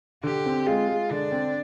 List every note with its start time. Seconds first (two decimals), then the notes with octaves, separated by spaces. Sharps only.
0.23 D3 G4
0.46 C4
0.67 G#3 F4
0.89 G#3
1.11 D3 D4
1.32 C4